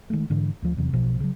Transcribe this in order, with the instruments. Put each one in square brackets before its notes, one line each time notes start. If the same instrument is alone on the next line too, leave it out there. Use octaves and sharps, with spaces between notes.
[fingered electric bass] D#3 G#3 A3
G#2 D3 E3
D2 F3
E2 C3 E3 F#3
B1 B2 F3
C#3 F#3